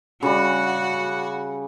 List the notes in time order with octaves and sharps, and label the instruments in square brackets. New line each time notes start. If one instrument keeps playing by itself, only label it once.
[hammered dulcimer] C#3 G3 [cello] F#4 F#5